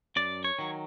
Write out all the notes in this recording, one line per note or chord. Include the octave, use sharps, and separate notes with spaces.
F#2 D5
C#5
D#3 F#3